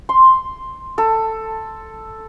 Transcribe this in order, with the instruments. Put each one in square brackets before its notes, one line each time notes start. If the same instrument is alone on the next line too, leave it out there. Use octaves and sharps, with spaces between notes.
[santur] C6
A4